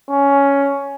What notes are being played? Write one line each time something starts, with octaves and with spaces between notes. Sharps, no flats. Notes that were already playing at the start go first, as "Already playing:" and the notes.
C#4